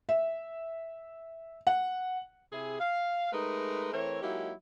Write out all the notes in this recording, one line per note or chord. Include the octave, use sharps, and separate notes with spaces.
E5
F#5
C3 E4 G#4
F5
G#3 A3 D#4 A#4 B4
E3 A3 C4 A#4 C#5
F#3 G#3 A#3 D#4 E4 G4